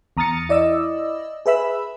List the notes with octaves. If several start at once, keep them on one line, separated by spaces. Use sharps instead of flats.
E2 A#5 D#6 F6 A6 C#7
E4 D5 D#5 E6
G#4 B4 E5 B5 E6